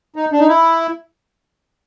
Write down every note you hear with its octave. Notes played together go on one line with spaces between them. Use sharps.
D#4
D4
D#4
E4